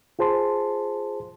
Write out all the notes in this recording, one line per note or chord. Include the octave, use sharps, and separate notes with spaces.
F4 G#4 C5 A5 C6